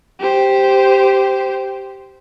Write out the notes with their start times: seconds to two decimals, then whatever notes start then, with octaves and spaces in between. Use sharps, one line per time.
0.20 G4 C5